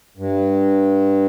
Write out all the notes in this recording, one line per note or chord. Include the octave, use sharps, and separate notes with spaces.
G2